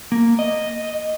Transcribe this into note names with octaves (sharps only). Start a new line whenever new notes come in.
A#3
D#5